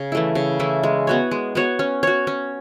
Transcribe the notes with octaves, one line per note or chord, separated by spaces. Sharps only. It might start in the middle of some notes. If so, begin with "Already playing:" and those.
Already playing: C#3
E3 A3 E4
C#3
E3 A3 E4
G#3
B3 F#4 C#5
G#3
B3 F#4 C#5
C#4
F#4 C#5
C#4